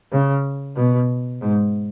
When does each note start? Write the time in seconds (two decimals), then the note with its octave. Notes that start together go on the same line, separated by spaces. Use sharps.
0.12 C#3
0.76 B2
1.41 G#2